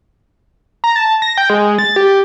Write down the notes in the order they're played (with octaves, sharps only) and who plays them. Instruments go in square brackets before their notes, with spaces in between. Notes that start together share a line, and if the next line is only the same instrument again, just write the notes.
[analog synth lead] A#5
A5
A#6
G5
G#3
A6
G4